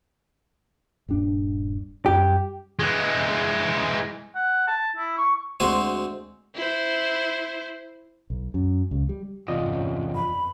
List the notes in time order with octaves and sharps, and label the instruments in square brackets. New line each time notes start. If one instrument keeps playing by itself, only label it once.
[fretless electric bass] D#1 G2 D4
[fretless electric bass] F#2 G3 [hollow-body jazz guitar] G4
[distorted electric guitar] E3 G#3
[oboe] F#5
A5
E4
C#6
[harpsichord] D2 G#3 C4 F#4 C5 G#5
[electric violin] E4 C5
[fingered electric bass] B1
F#2
C#2
G3
[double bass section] G1 G#2 C#4 [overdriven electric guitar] E2 C3 [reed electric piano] F4 D5 D#5
[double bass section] F2 B2 [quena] B5